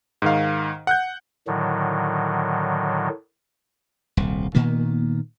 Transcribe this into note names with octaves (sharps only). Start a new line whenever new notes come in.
G#2 D#3 F5
F#5 F#6 G6
A2 D3 D#3 F#3
D#1 C2
A#2 D#3 A#3 B3